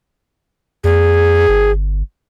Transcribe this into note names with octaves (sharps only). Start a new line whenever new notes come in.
F2 G#4
G1